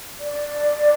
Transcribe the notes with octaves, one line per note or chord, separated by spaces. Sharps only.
D5